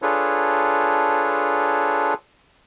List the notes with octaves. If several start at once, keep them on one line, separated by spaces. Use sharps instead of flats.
D4 F4 G#4 A4 B4 C#5